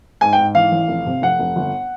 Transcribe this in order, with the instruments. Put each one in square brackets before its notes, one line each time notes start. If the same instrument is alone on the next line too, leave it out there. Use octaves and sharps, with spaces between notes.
[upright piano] G#2 G#5
G5
G#2
E3 F5
A1
F1
C3
F1 F#5
F1
G1